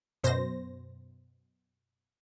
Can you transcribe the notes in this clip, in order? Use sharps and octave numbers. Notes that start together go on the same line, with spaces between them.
F#2 B2 C5 A#6